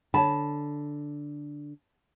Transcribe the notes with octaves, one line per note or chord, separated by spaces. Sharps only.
D3 C#5 A5 B5